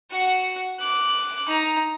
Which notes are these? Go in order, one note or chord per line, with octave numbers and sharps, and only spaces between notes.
F#4 F#5
D6 F#6
D#4 A#5